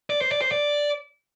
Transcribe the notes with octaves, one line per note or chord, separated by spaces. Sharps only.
D5
C5
D5
C5
D5